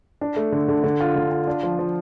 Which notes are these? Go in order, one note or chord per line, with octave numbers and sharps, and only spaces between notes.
D4
A3
D3
D3
D3
F4
D3
F4
D4
F3
F3